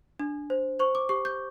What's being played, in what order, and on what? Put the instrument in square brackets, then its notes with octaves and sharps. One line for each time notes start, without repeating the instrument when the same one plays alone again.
[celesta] D4
C5
C5 C#6
D6
G4 C#6
G6